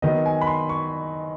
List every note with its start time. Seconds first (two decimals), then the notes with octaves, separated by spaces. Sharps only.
0.02 D#3 F#3 B3 D#5
0.26 G#5
0.41 B5
0.47 C6
0.69 C#6